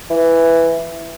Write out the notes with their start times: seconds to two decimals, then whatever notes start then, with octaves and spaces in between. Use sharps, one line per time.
0.10 E3